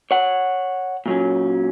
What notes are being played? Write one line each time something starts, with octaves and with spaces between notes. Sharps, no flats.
C#5 F#5
A#2 F#3 C#4